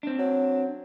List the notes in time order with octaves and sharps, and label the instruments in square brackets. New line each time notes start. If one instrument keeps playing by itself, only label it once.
[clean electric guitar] C4 D4
[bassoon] F#3